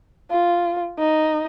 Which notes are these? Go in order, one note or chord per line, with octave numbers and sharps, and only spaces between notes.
F4
D#4